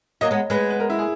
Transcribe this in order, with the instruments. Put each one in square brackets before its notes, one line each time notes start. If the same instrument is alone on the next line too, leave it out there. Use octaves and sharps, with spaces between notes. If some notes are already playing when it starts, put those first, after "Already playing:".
[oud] F#3 A#3 [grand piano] D#5
[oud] G#3 B3
[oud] G#3 B3 [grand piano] B4
[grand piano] B4
A#4
E4
G#4